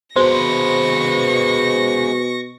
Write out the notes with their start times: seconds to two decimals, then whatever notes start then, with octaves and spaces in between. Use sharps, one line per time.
0.16 B2 G#3 B4 C5 C#6 A#6